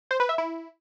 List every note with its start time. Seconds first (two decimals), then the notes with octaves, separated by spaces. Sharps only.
0.11 C5
0.20 B4
0.29 E5
0.38 E4